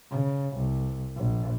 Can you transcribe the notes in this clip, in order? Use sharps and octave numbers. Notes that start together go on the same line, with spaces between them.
C#3
C2
A#1